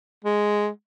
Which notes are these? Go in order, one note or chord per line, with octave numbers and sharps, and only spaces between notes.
G#3